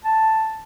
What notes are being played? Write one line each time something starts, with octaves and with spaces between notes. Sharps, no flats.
A5